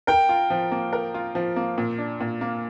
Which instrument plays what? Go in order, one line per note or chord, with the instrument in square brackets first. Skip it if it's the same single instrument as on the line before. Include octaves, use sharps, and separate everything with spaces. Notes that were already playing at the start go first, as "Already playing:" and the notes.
[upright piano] A#4 [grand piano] G5
[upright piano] F4
F3
A#3
A#4
F4
F3
A#3
A#2
D4
A#2
A#3